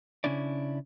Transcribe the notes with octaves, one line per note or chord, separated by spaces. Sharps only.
C#3 F3 C#4 D4 E4 D5